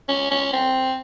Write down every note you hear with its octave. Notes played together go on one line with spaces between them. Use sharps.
C#4
C#4
C4